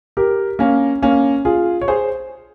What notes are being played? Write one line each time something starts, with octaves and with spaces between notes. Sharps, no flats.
G4 A#4
A#3 C#4
A#3 C#4
F4 G#4
C#5
G#4 C5